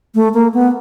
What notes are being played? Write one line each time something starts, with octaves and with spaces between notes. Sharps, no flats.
A3
A#3
B3